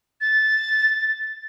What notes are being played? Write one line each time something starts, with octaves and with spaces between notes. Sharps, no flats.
A6